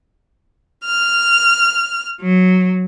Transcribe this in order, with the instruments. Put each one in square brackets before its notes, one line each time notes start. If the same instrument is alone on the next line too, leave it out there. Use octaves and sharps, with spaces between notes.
[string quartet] F6
F#3